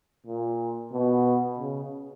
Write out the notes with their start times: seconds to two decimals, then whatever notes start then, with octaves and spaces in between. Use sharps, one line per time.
0.27 A#2
0.92 B2
1.59 C#3